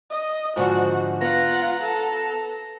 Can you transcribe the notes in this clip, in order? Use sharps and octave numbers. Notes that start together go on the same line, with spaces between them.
D#5
G#2 D3 F3 F#4
B3 F4 F#5 A#5
A4